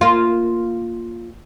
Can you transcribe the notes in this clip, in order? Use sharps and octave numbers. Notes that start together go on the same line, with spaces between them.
A#3 F4